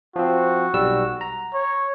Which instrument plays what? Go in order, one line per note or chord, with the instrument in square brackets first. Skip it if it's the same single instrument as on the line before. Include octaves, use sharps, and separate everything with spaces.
[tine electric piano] F3 C4 [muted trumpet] F#4
[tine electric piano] B1 G3 E6
A#5
[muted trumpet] C#5